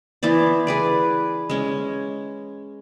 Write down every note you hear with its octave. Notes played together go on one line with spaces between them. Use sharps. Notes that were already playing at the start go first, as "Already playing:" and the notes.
E3 B3 C5 D5
G#4 B4 D5
G#3 C#4